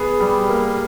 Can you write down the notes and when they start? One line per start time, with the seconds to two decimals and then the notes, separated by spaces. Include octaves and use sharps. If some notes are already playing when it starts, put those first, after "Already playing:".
Already playing: B3 G#4
0.20 G3
0.49 A#3